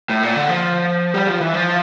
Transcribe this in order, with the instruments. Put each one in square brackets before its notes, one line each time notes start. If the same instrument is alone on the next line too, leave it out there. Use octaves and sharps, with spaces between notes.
[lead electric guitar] A2
A#2
D3
F3
G3
F3
E3
F3